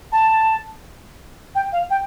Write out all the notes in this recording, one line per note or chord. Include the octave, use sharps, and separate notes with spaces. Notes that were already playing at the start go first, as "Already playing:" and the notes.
A5
G5
F5
G5